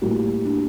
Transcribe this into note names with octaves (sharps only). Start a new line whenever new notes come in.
A2 G3 A#3 F#4
D4